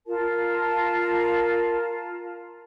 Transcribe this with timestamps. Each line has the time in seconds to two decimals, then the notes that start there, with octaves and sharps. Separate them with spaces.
0.06 F4 A#4 A5